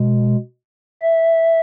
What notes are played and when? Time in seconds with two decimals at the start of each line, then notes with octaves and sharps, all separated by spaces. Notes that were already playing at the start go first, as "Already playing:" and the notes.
Already playing: B2 G#3
1.02 E5